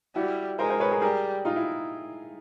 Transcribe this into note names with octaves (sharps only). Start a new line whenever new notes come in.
G3 E4 F#4
G#3 A#4 C5
A#4 C5
B4 C#5
G#4 A#4
G3 G#4 A#4
D#4 F4
E4